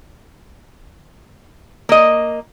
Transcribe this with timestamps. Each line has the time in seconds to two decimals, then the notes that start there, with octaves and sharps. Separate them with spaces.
1.89 A#3 D#5